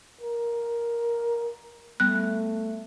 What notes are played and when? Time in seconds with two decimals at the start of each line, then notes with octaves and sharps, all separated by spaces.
0.21 A#4
2.00 G3 A3 B3 F#6